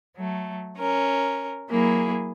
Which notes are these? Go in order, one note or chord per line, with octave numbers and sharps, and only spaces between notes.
F#3 A3
C#4 A#4
F#3 A#3 E4 G#4